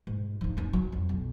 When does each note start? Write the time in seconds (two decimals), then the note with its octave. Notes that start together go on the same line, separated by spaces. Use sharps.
0.07 G#2
0.41 F3 D#4
0.57 F#2 C#4
0.73 F#3
0.92 F2
1.09 B1